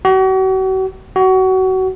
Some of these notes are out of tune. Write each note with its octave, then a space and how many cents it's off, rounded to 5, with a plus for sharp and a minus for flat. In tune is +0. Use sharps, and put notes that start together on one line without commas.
F#4 +40
F#4 +25